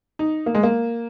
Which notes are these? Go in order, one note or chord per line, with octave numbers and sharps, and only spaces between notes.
D#4
A#3
G#3
A#3